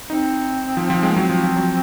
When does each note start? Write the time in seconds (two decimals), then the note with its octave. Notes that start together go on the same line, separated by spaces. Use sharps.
0.10 C4 D#4
0.77 F3
0.90 F3
1.03 G#3
1.11 A#3
1.16 F#3 C4
1.30 F3
1.43 F3
1.56 F#3